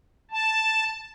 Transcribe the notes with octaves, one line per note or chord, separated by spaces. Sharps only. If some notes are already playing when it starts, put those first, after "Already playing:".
A5